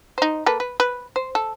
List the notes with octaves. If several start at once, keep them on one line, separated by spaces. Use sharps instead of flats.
D#4 C5
A#3 A4 B4
B4
B4
C5
A4